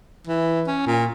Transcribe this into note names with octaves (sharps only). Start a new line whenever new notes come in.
E3
C#4
A#2